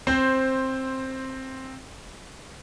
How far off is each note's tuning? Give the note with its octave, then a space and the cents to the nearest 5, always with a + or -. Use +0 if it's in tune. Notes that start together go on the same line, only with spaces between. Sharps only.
C4 +10 C5 +5